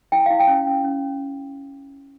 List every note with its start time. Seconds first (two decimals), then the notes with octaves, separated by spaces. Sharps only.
0.12 E4 G5
0.26 E4 F5
0.40 G5
0.47 C#4
0.66 C#4
0.84 C#4